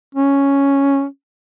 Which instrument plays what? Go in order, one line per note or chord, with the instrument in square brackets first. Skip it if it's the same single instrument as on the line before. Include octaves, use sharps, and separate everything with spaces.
[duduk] C#4